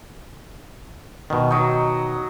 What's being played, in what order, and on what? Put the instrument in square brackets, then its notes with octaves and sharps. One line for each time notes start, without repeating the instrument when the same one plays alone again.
[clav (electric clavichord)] B2 D#3
[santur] F#3 D#4